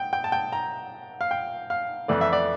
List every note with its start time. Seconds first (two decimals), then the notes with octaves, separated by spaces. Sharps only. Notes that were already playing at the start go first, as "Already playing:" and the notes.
Already playing: G5
0.13 G5
0.24 A5
0.32 G5
0.52 A#5
1.21 F5
1.31 G5
1.70 F5
2.08 F2 E3 A3 D5
2.21 E5
2.33 D5